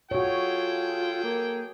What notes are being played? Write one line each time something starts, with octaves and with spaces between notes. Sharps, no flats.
F4 F#4 G#4 A4 C#5 G5
A#3